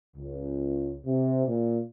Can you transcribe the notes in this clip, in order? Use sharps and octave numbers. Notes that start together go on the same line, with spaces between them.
C#2
C3
A#2